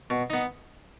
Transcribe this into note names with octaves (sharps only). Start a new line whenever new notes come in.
B2
B3 D#4